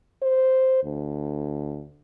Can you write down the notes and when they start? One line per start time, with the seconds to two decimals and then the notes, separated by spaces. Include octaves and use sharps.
0.22 C5
0.84 D2